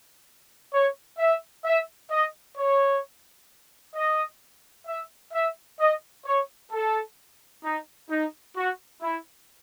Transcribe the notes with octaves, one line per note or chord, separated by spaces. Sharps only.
C#5
E5
E5
D#5
C#5
D#5
E5
E5
D#5
C#5
A4
D#4
D#4
F#4
E4